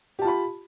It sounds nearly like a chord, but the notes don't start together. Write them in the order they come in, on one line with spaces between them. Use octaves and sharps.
G4 A5 F4 B5